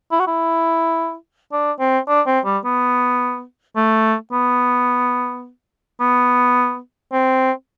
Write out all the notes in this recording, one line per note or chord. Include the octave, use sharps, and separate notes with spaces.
E4
F#4
E4
D4
C4
D4
C4
G3
B3
A3
B3
B3
C4